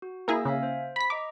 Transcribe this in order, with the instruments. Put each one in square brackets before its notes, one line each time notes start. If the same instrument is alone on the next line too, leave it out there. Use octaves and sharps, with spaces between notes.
[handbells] F#4
[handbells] A#3 E6 A#6 [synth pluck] E4 G#4 A#4
[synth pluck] C#3 [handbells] E5 F5 G#5
[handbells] C5
[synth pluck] B5 B6
[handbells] D#5 A#5 [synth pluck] D6